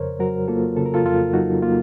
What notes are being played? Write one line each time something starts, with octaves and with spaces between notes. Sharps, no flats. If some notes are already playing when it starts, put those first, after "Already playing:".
Already playing: F2 C#3 A#4 C5 C#5
F#3 F#4 A#4
A#3 F4 A4
C#3 A4
A#4
F4 A4
F2 F4 A4
F#3 D#4 F#4
A#3 F4